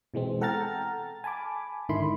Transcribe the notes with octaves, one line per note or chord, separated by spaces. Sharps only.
B2 E3 G#3 C4
A4 F#5 G5 A#5 F6 A6
G#5 A5 B5 D6
G#2 D3 D#3 E4 B5 C6